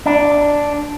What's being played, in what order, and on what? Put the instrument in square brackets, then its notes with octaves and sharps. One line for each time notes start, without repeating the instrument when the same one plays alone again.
[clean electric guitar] D4